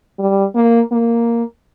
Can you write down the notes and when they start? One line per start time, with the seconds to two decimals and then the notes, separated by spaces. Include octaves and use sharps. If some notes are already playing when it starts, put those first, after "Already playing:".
0.19 G3
0.55 A#3
0.92 A#3